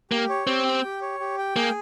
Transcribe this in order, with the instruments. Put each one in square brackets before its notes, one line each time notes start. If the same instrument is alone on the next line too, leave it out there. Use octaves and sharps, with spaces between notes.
[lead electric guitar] A#3 [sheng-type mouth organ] G4
[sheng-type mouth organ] C#5
[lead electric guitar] C4 [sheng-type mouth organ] G4
[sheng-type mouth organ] G5
G4
C#5
G4
G5
[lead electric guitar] A#3 [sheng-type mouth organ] G#4